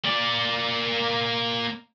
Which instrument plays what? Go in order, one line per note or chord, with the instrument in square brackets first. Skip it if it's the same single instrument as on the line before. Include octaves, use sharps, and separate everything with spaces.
[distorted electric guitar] A#3 D5